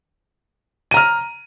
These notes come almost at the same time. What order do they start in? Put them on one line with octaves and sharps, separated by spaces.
D#7 A#5 F6